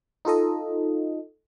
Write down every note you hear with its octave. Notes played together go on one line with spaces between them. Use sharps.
D#4 F4 A4 D#5